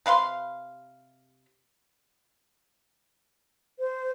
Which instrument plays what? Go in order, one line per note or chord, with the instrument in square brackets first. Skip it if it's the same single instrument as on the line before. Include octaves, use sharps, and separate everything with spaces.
[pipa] C3 B4 F5 C6
[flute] C5